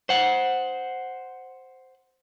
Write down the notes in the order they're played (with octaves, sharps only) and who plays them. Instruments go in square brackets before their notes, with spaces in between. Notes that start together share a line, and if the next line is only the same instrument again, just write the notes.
[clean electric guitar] C5 F#5